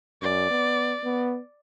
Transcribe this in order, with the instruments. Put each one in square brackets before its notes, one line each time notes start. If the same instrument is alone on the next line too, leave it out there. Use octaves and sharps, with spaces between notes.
[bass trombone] F#2 [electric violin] D5
[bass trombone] B3
B3